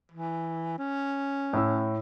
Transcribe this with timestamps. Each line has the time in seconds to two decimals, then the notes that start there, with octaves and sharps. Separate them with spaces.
0.12 E3
0.78 C#4
1.53 A2 E6